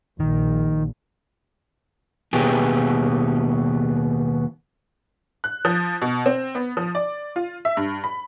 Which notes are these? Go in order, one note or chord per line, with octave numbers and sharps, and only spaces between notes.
A#1 A#2 D#3
D#2 B2 B3 G4 G#4
F#6
F3
B2
C4
B3
F3
D5
F4
E5
G2
B5